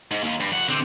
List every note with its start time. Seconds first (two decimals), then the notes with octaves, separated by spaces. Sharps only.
0.11 G#2
0.24 D#2
0.40 G2
0.52 F2 F#5
0.69 D3 C4